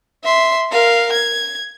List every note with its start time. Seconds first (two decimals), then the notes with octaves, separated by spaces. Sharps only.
0.23 E5 C6
0.71 A#4 F5
1.13 G#6